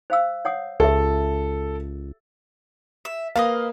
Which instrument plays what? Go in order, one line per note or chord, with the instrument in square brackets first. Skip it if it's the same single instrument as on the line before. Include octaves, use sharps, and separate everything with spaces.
[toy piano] C5 F5 E6
C#5 F#5 D#6
[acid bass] C#2 [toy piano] G4 E5 [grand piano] A4
[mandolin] E5
[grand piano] A#3 [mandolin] A4 B4 D#5 [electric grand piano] F5